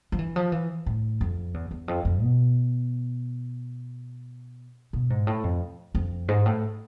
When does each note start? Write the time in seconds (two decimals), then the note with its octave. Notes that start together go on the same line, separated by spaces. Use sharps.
0.12 F3
0.19 E3
0.36 F3
0.52 E3
0.86 A2
1.21 F2
1.54 E2
1.71 E2
1.88 F2
2.05 F2
2.22 B2
4.93 B2
5.10 G#2
5.27 A2
5.44 F2
5.95 F2
6.28 G#2
6.46 A2